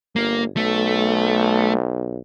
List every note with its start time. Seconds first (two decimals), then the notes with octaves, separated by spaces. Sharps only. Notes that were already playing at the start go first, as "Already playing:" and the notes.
0.16 G1 A#3
0.57 B1 A3